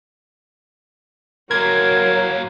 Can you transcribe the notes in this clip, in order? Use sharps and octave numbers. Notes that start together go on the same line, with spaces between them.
F#2 F#3 A#3 A#4 G#6